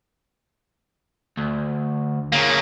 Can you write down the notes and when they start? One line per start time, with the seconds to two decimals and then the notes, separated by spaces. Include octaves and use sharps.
1.37 D2
2.32 C#3 A#3